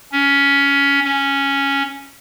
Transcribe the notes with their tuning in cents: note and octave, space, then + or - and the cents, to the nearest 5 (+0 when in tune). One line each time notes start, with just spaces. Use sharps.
C#4 +15
C#4 +0